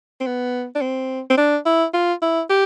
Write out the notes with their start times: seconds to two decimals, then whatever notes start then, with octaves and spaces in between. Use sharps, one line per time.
0.20 C4
0.26 B3
0.75 D4
0.81 C4
1.30 C4
1.37 D4
1.65 E4
1.94 F4
2.22 E4
2.50 G4